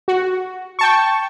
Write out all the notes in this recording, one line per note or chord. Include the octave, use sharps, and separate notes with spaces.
F#4
G5 A5 C#6